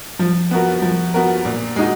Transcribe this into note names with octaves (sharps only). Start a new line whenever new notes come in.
F3
B3 F#4 A#4
F3
B3 F#4 A#4
A#2
G#3 D#4 F#4